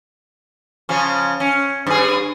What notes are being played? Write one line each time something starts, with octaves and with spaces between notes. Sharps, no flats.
C#3 F3 C#4
C#4
G2 G#4